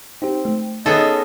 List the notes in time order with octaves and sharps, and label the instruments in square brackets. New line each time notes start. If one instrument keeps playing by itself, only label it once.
[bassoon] C4 [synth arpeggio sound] D#4 G4
[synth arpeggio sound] A3
[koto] B3 G#4 A4 [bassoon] C#4 [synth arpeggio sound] D#4 [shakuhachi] D#5